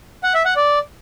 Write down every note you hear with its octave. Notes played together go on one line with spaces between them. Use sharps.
F#5
E5
F#5
D5